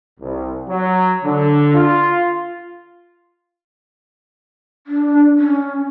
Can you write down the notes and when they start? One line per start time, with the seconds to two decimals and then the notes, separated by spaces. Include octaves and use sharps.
0.20 C2
0.68 F#3
1.24 D3
1.74 F4
4.87 D4
5.39 C#4